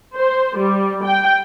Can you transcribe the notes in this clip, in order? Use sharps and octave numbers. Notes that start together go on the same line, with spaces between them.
C5
G3
G5